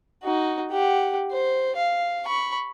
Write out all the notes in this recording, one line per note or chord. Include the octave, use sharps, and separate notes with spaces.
D#4 F#4
G4 F#5
C5
F5
B5 C#6